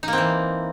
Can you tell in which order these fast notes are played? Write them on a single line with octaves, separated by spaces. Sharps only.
D#4 A#3 C4 E3